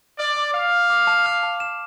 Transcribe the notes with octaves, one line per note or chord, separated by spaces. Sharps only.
D5 F6
D6
F5 D6
D6
D6
A5
F6
A5
E7